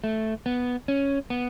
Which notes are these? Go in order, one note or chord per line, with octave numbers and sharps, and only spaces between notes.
A3
B3
C#4
B3